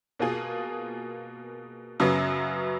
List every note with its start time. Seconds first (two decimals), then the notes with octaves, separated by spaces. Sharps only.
0.20 B2 A#3 F4 G#4
2.00 F#2 C#3 F#3 B3